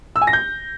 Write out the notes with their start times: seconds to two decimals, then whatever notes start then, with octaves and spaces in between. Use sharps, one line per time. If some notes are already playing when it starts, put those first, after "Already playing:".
0.16 E6
0.21 G#5
0.27 A#6
0.33 G6